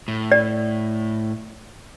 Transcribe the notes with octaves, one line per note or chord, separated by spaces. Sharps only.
A2
D5